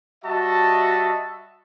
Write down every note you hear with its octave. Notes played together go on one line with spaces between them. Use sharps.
G3 F#4 D#5 E5 A5